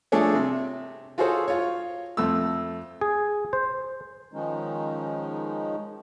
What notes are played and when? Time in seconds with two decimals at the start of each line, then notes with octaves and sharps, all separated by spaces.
0.12 F3 A3 D4 G#4 A4 C#5
0.35 C3
1.18 F4 F#4 G#4 A4 C5 C#5
1.48 F4 C#5
2.17 F2 A3 E6
3.01 G#4
3.53 C5
4.33 D#3 F3 G#3 C#4 D#4